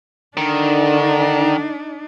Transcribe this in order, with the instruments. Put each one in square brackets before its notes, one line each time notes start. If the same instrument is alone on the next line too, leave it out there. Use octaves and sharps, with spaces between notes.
[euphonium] D3 [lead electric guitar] D#3 [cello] D4 D#4